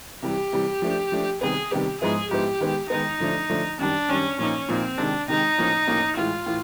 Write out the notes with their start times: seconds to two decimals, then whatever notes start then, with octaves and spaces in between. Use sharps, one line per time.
0.23 C3 E3 G3 G4
0.53 C3 E3 G3
0.82 F3 A3 D4
1.12 F3 A3 D4
1.41 C3 D#3 G3 B3 G#4
1.71 C3 D#3 G3 B3 G4
2.01 G#2 F3 G#3 B3 E4 G#4
2.31 G#2 F3 G#3 B3 E4 G4
2.61 D#3 G#3 B3
2.90 D#3 G#3 B3 D#4
3.20 D3 F3 A3 D4
3.50 D3 F3 A3 D4
3.79 F#2 D#3 G3 D4
4.09 F#2 D#3 G3 C#4
4.39 A#2 F3 A#3 C#4 D#4
4.69 A#2 F3 A#3 C4 D#4
4.98 C3 D#3 G#3 D4
5.28 C3 D#3 G#3 D#4
5.58 A2 F3 A#3 C#4
5.87 A2 F3 A#3 C#4
6.17 A2 E3 G#3 F4
6.46 A2 E3